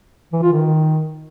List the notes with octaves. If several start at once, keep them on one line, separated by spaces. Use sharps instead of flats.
E3
F4
D#3